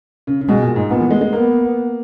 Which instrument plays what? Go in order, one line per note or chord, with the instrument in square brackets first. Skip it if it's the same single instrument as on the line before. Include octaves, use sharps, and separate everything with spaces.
[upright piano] C#3
C#3
[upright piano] B2 [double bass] G#3
[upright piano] A#2
G#2
[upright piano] A#2 [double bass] B3
[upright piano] E3
G#3
G#3
[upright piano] A#3 [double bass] B3